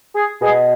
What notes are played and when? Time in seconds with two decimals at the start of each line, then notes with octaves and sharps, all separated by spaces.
0.15 G#4
0.42 B2 G#4